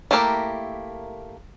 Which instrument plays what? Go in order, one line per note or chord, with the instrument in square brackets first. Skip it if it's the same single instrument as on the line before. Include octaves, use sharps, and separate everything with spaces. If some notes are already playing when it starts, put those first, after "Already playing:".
[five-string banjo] A3 A#3 E4 G4 A#4